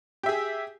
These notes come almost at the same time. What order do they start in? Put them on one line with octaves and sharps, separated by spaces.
G4 E5 G#4